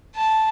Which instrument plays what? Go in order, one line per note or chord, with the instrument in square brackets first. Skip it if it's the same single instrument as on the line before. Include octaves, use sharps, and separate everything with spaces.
[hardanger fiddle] A5